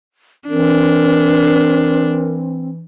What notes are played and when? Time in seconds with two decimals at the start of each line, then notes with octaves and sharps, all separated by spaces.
0.49 E3 C4 D4 A#4